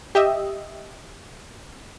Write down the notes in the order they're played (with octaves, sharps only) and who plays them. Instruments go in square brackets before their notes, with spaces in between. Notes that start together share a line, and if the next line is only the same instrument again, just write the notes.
[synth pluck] G4 D#5 E5